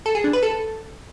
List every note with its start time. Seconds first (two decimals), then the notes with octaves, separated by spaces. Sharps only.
0.06 A4
0.15 G#4
0.24 D4
0.33 B4
0.43 A4